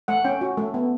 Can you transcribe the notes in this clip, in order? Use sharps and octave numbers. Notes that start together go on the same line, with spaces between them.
A3 F#5
C#4 G5
F#4
A3
B3